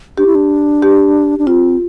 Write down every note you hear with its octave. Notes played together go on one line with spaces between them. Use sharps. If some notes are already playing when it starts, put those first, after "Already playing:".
D4 G4
E4
D4
G4
D4
C4 F4